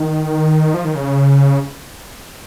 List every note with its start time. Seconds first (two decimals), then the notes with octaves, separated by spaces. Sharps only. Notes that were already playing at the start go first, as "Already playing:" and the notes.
Already playing: D#3
0.74 F3
0.85 D#3
0.95 C#3